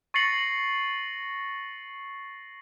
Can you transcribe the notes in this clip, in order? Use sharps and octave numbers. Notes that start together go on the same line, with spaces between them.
C#6 A6 A#6 C7 C#7 F#7